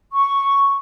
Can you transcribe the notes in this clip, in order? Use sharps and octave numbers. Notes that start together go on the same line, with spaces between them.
C#6